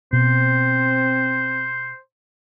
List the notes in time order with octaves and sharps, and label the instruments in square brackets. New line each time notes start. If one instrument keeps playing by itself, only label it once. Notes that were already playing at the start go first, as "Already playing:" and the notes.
[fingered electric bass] B2 [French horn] C4 [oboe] C5